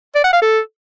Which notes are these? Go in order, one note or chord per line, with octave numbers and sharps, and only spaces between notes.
D5
F#5
F5
A4